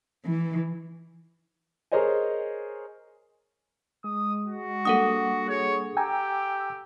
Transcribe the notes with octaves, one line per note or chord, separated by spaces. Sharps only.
E3
G#4 A#4 C5 C#5 D#5 G#5
G#3 D#6
F#4
G3 A#3 D4 A4 F#5 D#6
G#4 C#5
G4 G5 G#5 A#5 E6